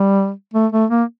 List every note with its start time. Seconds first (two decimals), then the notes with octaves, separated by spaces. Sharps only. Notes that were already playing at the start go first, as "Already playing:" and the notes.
Already playing: G3
0.54 A3
0.72 A3
0.90 A#3